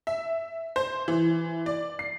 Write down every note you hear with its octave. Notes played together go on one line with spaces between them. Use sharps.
E5
C5
E3
D5
C7